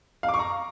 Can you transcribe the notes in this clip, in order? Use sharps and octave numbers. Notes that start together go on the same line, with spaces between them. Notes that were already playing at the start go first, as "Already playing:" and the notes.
F5
D6
C#6
A#5